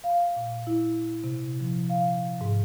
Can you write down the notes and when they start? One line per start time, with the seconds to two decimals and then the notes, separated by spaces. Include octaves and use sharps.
0.04 F5
0.36 A#2
0.67 E4
1.24 C3
1.61 F3
1.90 F5
2.41 G#2